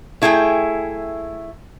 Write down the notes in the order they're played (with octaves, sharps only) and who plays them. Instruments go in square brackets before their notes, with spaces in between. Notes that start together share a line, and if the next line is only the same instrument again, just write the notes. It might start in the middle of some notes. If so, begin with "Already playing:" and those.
[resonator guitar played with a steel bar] A3 E4 G#4 A4 G5